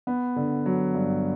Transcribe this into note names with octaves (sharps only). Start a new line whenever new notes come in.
B3
D3
F#3
G2